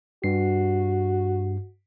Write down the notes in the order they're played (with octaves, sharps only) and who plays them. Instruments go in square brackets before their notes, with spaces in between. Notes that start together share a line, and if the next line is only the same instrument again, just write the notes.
[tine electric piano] G2 C7 [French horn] F#4